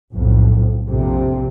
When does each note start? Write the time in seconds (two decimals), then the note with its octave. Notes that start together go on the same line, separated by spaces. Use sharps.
0.12 B1 F2 A2
0.87 A#1 F2 C3